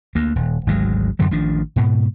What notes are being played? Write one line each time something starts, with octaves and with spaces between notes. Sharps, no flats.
D2 A#3
D#1
G#1 D2 F#3 G#3
F#2 D3 E3 F#3
A1 D#3 F3 D4
G#2 B2